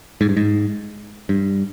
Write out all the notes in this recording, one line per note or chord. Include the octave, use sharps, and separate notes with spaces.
G#2
G2
G#2
G2